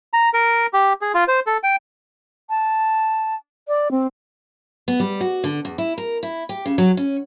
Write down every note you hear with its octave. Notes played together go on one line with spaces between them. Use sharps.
A#5
A#4
G4
G#4
F4
C5
A4
G5
A5
D5
C4
B3
G3
F#4
D3
E2
E4
A#4
E4
G4
C#3
F#3
C#4